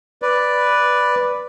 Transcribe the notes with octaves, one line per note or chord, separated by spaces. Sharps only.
B4 D5